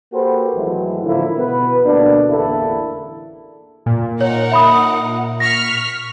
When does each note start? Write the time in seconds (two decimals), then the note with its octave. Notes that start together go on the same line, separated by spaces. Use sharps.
0.13 A#3 F#4 G4 A4 B4 C5
0.55 G#1 E3 F#3 G#3 A3 E4
1.05 A2 D3 D#3 F3 A#3 E4
1.37 B2 B3 B4
1.84 D2 B2 A#3 D4
2.29 A1 E2 D3 A#3 E4 A4
3.86 A#2
4.21 D#4 A#4 C#5 F#5
4.51 E5 B5 D#6
5.40 C#6 F6 A#6 B6